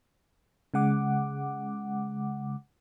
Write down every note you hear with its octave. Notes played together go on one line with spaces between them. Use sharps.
C#3 G#3 F#5 D6